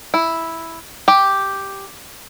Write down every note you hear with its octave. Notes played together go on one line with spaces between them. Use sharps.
E4
G4